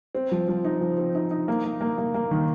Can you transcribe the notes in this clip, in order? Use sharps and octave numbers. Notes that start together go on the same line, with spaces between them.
C4
F3
F3
D#4
F3
C4
D#4
D#4
A#3
A#3
A#3
A#3
A#3
D#3